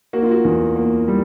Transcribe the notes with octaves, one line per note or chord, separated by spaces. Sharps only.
A#3 F#4
F4
F#4
E2
A#3
G3